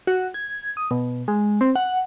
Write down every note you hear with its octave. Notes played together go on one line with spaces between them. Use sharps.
F#4
G#6
D#6
B2
G#3
C4
F#5